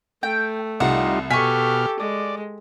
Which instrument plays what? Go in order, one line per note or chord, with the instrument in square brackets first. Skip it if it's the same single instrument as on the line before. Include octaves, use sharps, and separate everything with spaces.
[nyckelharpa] A3 [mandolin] G5
[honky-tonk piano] C2 [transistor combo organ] G3 D#4 F4 [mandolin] F#5
[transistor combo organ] B2 F6 [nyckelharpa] G4 A4 [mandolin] G#5 C#6 [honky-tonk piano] B6
[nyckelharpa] G#3 [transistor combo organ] D5